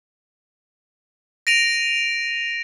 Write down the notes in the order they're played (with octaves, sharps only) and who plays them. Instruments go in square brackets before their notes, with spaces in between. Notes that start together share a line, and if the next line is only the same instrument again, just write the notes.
[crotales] A#6 D7 D#7 F7